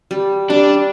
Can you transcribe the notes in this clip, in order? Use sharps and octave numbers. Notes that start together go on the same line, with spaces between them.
G3
G3 D4